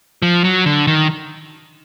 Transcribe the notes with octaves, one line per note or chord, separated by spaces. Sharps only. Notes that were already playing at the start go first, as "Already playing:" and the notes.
F3
F#3
D3
D#3